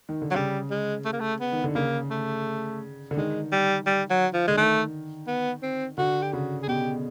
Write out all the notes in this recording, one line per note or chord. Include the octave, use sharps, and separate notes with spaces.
D#3
D3
F#3
C#3 G3
G#3
A3
A#3
A3
B3
D#3
D3
C#3 A#3
A3
D3
D#3 G#3
G3
G3
F#3
F3
D3 G#3
D#3 A3
B3
C4
D3 F#4
G4
C#3 F#4
G#4
B2 G4